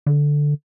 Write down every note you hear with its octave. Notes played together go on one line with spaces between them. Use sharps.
D3